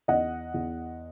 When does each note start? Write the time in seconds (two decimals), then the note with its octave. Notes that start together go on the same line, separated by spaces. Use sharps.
0.08 E2 D#5 F#5
0.54 E2